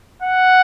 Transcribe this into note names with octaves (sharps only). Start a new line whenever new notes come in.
F#5